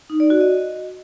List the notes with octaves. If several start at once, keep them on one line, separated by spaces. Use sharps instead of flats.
D#4
D5
F#4
D#5